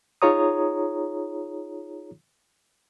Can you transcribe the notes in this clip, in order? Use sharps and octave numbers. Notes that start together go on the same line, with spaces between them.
D#4 F4 G#4 C#5 A#5 D#6